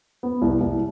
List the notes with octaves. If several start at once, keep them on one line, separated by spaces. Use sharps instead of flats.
B3
C2
C2